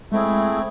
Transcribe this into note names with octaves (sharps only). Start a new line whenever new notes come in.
G#3 A3 C4 E4 G#4